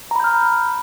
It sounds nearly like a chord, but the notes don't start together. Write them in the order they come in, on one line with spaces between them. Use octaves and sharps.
A#5 B5 G6 F6